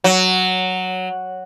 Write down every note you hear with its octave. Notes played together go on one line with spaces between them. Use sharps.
F#3